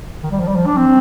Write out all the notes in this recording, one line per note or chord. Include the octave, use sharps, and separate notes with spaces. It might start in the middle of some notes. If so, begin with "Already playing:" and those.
D#3
G3
F3
G3
F3
D4
C4